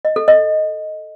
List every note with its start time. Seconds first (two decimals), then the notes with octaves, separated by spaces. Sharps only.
0.05 D#5
0.16 A4
0.28 D#5